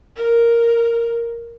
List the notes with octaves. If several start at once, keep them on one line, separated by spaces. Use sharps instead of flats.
A#4